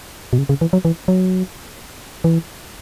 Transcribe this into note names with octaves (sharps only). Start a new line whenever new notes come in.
B2
C#3
C#3
E3
F#3
E3
F#3
E3